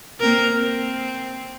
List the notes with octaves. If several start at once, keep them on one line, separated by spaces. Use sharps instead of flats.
A#3 C4 A#4
C4